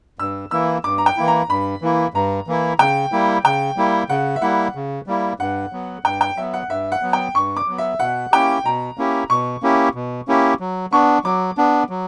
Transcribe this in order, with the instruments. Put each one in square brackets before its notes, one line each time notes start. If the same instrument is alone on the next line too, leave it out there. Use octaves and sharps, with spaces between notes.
[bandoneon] G2 [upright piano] E6
[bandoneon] E3 A#3 E4 [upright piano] E6
[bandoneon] G2 [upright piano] D6
[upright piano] A#5
G5
[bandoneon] E3 A#3 E4
[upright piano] A#5
[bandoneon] G2 [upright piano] B5
[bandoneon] E3 A#3 E4
[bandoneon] G2 [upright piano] A#5
[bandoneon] E3 A#3 E4
[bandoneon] C#3 [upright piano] G5
[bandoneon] G3 A#3 E4
[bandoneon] C#3 [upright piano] G5
[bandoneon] G3 A#3 E4
[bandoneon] C#3 [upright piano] F#5
[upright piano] E5
[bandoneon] G3 A#3 E4 [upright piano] F#5
[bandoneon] C#3
G3 A#3 E4
[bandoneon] G2 [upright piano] F#5
[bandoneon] F#3 B3
[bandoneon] G2 [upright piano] G5
[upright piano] G5
[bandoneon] F#3 B3 [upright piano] E5
[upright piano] F#5
[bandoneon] G2 [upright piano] E5
[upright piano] F#5
[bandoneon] F#3 B3
[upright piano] G5
[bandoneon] G2 [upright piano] C#6
[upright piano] D6
[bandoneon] F#3 B3
[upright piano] E5
[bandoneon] B2 [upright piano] F#5
[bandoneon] A#3 C#4 E4 G4 [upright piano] G5
[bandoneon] B2 [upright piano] A#5
[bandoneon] A#3 C#4 E4 G4
[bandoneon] B2 [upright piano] C#6
[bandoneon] A#3 C#4 E4 G4
B2
A#3 C#4 E4 G4
F#3
[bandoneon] B3 D4 [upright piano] C#6
[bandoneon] F#3 [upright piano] D6
[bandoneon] B3 D4
F#3